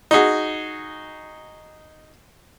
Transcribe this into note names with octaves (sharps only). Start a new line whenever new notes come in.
D#4 F#4 G#4